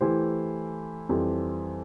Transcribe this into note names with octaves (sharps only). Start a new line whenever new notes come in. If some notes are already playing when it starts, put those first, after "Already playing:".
E3 A3 E4 G4 C5
F2 E3 G3 C4 G4